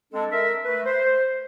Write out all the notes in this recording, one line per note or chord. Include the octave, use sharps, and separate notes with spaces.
G#3 C4 D4 A4
A#4 E5
A3 B4
C5